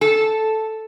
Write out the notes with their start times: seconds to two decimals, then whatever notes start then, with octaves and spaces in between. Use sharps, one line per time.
0.01 A4